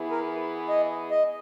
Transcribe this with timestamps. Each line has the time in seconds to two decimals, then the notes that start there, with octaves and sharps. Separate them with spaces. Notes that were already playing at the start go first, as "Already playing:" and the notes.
Already playing: E3 B3 E4 G#4
0.11 A#4
0.69 D#5
1.11 D#5